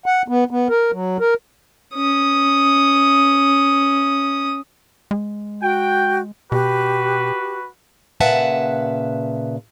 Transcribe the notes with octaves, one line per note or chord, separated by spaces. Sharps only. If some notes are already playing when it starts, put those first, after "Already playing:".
F#5
B3
B3
A#4
F#3
A#4
C#4 D#6
G#3
F#4 G5
B2 F#4 G4 B4
A#2 C#3 B4 E5 F#5 A5